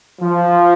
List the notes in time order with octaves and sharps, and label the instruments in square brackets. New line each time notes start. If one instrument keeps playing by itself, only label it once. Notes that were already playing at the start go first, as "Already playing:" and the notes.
[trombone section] F3